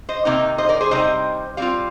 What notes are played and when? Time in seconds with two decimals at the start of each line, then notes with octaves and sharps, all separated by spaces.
0.09 C5 D#5
0.25 C3 D#3 A#3 D#4
0.58 C5 D#5
0.69 A#4 D5
0.80 G#4 C5
0.91 C3 G3 C4 D#4 C5 D#5
1.57 G3 C4 F4 D5 F5